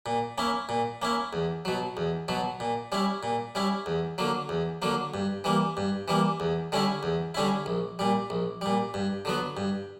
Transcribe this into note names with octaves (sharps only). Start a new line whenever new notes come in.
A#2
A#3 C#4 E4
A#2
A#3 C#4 E4
E2
B2 F#3
E2
B2 F#3
A#2
G3 C#4 E4
A#2
G3 C#4 E4
E2
D3 F#3 A#3
E2
D3 F#3 A#3
G2
E3 G3 A#3
G2
E3 G3 A#3
E2
D3 G3 C#4 E4
E2
D3 G3 C#4 E4
A#1
A#2 G3
A#1
A#2 G3
G2
D3 F#3 B3
G2